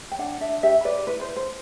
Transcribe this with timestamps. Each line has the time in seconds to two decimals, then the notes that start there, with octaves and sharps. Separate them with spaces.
0.12 G5
0.19 D4 F#5
0.41 D4 E5
0.63 G4 E5
0.85 B4 D5
1.07 E4 B4
1.21 C5
1.28 B4
1.36 C5